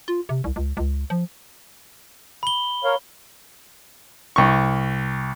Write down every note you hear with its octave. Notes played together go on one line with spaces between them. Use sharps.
F4
C3
C2
C#2
C#2
F3
B5 G7
A#4 C#5 F5
C2 C#6